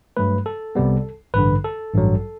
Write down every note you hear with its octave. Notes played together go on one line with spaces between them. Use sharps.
G2 F#3 A3 B4
A4
C2 C3 G3 B3
A1 G2 D3 B4
A4
A1 G2 F#3